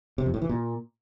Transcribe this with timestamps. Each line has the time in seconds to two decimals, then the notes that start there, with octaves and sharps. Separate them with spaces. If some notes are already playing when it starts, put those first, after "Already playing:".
0.18 C3
0.26 F2
0.34 A2
0.42 E3
0.49 A#2